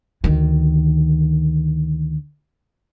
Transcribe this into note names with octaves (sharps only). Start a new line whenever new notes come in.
D2 D#3